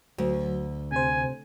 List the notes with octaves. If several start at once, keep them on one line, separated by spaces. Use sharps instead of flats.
D2 F#3
C3 C5 G#5